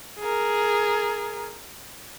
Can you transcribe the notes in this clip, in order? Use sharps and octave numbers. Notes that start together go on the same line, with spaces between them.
G#4 A#4